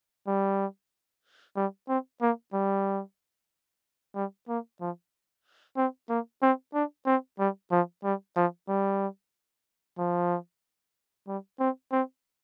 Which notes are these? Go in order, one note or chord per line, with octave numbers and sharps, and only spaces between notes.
G3
G3
C4
A#3
G3
G3
A#3
F3
C4
A#3
C4
D4
C4
G3
F3
G3
F3
G3
F3
G3
C4
C4